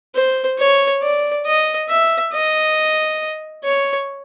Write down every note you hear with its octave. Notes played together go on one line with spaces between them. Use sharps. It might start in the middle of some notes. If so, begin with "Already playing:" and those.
C5
C#5
D5
D#5
E5
D#5
C#5